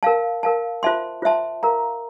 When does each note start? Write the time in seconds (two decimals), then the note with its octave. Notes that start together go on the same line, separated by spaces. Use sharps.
0.03 A#4 F5 A5
0.43 A#4 F5 A5
0.83 F4 C5 E5 A5 C6
1.22 F4 C5 E5 A5 C6
1.63 A#4 F5 A#5